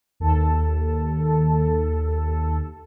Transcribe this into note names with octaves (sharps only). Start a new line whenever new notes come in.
D#2 A4